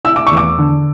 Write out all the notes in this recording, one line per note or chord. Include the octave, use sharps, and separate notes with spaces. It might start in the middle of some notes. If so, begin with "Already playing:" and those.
E4 E6
D6
E2 C#6
D6
D3